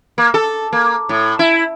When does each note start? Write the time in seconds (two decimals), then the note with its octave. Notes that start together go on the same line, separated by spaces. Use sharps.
0.18 A#3
0.34 A4
0.73 A#3
1.09 A2
1.39 E4